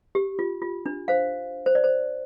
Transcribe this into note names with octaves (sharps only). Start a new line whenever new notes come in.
G4
F4
F4
D4
C5 F5
C5
D5
C5